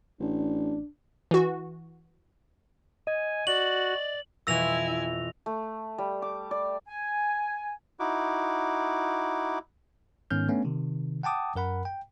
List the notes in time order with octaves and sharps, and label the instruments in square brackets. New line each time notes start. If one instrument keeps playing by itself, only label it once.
[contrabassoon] A1 [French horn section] D4
[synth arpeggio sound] E3 F#4
[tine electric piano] D#5 [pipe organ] G#5
[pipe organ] F#4 [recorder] D5 [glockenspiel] F#7
[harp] F2 B2 E3 [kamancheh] E4 G#5 [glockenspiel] E6 A#6 F7
[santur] A3
G3
D6
D5
[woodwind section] G#5
[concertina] D#4 E4 F#4 D6
[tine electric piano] G#2 D#3 B3 C#4 F6 G6
A3 B3 C#4 D4
C3 D#3
F#5 G5 A5 D6 D#6
F#2 A#4 F#5 B5
G5